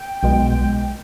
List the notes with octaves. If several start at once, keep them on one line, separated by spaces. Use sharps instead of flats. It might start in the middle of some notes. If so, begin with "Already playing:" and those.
Already playing: G5
B1 B2 G#3